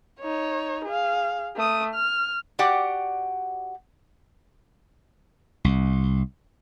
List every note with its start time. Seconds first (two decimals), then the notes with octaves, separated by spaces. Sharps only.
0.20 D#4 C#5
0.85 G#4 F5
1.56 A3 D#6
1.94 F6
2.59 F#4 G4 D5 F#5 G5
5.64 C2